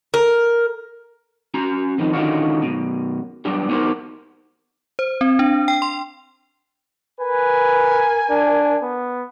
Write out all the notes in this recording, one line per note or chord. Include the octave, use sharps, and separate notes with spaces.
A#4
C#4 F#4 A#5
F2 D#3 F3 D#4
D3 D#3 C#4 D#4 F4 F#4
F#2 B2
F#3 G3 B3 D4 G4
B3 D#4 F#4 G4 A#4 C5
C5
C4
D4
G5
C6
A#4 B4 G#5
D4
B3